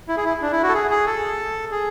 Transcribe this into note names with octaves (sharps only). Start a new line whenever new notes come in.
E4
G#4
E4
D4
E4
F#4
A4
G#4
G#4
A4
G#4